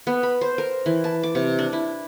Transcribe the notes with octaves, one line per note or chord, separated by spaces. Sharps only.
B3
B5
C5
A#4
E3
A5
D6
C3
D4
E4